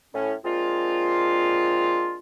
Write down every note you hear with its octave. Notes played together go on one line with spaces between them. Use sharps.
A2 C#4
G#3 A#3 C4 D4 F4